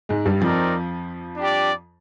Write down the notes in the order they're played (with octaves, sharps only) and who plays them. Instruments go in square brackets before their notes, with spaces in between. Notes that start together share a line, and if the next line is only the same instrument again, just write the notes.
[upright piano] G#2 G#3
G2 G3
[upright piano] F2 F3 [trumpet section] C4 D#4 A#4 D5
[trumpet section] D4 G4 D5